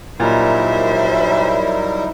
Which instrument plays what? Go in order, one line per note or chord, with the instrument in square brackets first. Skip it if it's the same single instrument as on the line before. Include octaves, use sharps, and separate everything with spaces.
[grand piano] A#2 [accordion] F#3 G3 A#4 [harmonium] D#4 E4 [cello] C5 E5